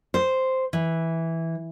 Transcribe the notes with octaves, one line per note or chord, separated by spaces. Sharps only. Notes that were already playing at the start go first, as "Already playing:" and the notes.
C5
E3